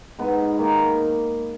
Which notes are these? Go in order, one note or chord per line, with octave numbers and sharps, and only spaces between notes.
G#2 B3
D#3 A#3